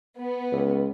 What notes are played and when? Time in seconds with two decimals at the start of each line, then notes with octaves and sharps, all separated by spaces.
0.18 B3
0.52 C#2